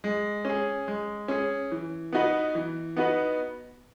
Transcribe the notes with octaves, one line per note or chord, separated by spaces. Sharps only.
G#3
C#4 G#4
G#3
C#4 G#4
E3
B3 D#4 F#4 B4
E3
B3 D#4 F#4 B4